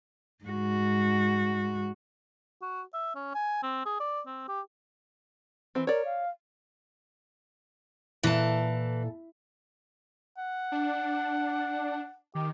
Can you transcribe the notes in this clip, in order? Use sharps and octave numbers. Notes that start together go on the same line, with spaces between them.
G#2 F#4
F#4
E5
C#4
G#5
C4
G#4
D5
C4
G4
E3 C4
A#4 C#5 D5
F5
A#2 E3 A4 A5
F#5
D4
D#3 G4